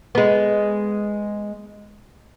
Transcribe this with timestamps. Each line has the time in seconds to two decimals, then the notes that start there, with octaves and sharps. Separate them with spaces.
0.15 G#3 B3